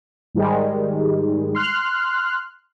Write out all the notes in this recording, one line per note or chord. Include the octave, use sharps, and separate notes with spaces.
G#2 D#3 G3 G#3
C6 F6 F#6